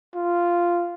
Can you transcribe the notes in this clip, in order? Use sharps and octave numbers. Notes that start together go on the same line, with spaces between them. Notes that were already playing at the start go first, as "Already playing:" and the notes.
F4